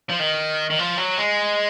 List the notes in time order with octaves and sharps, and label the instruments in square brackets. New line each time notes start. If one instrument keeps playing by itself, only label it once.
[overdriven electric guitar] F3
D#3
D#3
F3
F#3
G#3